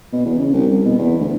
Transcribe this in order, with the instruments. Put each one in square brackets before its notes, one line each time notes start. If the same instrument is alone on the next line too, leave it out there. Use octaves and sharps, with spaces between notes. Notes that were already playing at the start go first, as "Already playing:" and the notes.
[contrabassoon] B2
E2
C#3
C2
C2
B2
E2
D2